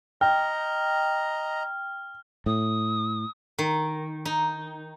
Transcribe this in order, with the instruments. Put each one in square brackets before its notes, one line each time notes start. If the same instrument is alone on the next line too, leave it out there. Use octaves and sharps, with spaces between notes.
[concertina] D#5 A#5 [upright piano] G5 [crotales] F6
[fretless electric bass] A2 [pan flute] D#6
[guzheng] D#3
D#4